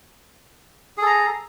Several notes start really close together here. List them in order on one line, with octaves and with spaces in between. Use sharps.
G#4 A4 A#5